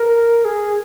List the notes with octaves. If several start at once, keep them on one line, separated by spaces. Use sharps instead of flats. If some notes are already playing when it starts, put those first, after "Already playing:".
Already playing: A#4
G#4